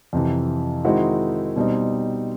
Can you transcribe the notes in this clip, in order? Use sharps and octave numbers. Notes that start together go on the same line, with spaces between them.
F2 C3 E3
D#3 G#3 C4 D#4 E4 F#4
B2 G3 C4 D#4